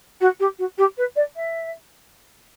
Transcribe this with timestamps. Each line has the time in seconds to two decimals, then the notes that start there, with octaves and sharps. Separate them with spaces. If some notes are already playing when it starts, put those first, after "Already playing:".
0.21 F#4
0.40 G4
0.59 F#4
0.78 G4
0.97 B4
1.16 D5
1.35 E5